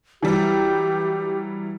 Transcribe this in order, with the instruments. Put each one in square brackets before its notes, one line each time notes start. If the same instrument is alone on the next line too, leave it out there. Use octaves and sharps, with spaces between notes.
[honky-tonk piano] E3 F#3 G3 [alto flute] G4